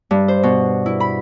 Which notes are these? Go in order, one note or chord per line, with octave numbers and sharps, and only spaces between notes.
G2
C5
B2
E4
B5